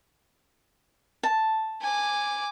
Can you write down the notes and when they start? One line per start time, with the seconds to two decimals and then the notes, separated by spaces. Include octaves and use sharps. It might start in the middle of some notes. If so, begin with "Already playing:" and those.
1.23 A5
1.82 G#5 D6